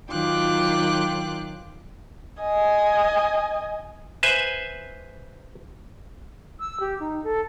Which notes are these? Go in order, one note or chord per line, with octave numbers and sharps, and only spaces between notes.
D#3 F#3 F4 G5 D6 F#6
D#5 G#5
B4 C5 E5 G#5
E6
G4
D#4
A4